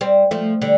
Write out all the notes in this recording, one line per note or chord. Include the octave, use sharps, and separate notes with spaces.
G3 C4
F3 A3
D3 G3